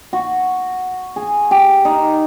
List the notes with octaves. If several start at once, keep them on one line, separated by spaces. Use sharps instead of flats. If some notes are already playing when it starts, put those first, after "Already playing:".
F#4
G#4
G4
D#4